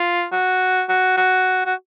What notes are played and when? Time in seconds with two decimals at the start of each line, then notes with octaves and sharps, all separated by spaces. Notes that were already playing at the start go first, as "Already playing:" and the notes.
Already playing: F4
0.32 F#4
0.89 F#4
1.17 F#4
1.66 F#4